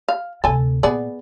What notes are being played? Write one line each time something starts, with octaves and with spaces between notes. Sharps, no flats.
F5
D2 C3 A4 G#5
A#2 B3 G#4 D5